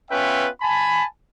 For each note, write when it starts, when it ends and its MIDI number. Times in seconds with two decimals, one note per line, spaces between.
0.11 0.48 59
0.11 0.48 61
0.11 0.48 65
0.11 0.48 71
0.11 0.48 76
0.11 0.48 79
0.62 1.05 80
0.62 1.05 81
0.62 1.05 83